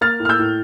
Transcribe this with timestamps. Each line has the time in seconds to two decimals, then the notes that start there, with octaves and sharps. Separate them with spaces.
0.01 A#3 F6 A6
0.20 A2
0.25 F6
0.29 E6 G6
0.39 A2